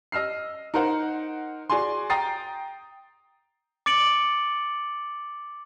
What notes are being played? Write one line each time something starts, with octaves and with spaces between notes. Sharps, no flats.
D#5 E6 F6 C7
D#4 A#4 C5 F#5
F#4 G#4 D5 G#5 C6
G5 A#5 D#6 A6 C7
D6 A6 C#7 D7 F#7